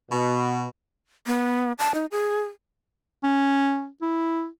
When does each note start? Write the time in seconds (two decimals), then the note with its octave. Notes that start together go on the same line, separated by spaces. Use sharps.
0.12 B2
1.27 B3
1.79 A5
1.94 D#4
2.12 G#4
3.24 C#4
4.02 E4